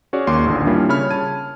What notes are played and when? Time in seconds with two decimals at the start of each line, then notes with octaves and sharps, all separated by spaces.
0.13 C#4 F#4 G#4 C#5 D5
0.27 D#2 A#3 C6 D6
0.46 A1 D#2 A#2 D3
0.67 G3 A#3 C#4 D4 E4 F4
0.89 C#3 C#5 B5 F6
1.11 A5 G#6 D#7